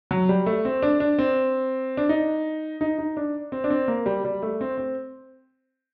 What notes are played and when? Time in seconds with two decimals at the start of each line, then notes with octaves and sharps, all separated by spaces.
0.11 F#3
0.29 G3
0.46 A3
0.65 C4
0.82 D4
1.00 D4
1.19 C4
1.97 D4
2.09 D#4
2.81 D#4
2.98 D#4
3.17 D4
3.52 C4
3.64 D4
3.70 C4
3.88 A#3
4.06 G3
4.25 G3
4.42 A3
4.61 C4
4.78 C4